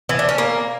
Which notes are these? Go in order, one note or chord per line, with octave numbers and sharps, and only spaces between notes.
E3
D4
C#4
A#3